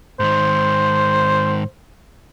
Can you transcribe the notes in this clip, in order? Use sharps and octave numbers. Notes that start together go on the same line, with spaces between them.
G#2 D#3 C5